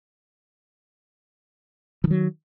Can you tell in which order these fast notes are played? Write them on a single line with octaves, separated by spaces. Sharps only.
E3 D#3 F#3